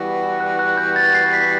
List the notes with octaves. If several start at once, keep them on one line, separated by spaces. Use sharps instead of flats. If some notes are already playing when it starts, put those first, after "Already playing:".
Already playing: E3 G3 B3 F#4
F#6
F#6
G6
A6
C7
B6